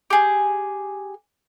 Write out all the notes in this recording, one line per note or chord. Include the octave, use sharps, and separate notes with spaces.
G4 G#4